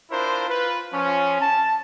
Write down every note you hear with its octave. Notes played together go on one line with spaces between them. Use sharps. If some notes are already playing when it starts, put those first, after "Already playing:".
D4 E4 F4 A#4 C5
F4 B4
F3 C#4
A5